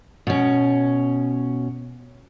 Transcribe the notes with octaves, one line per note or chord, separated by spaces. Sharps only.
B2 C#4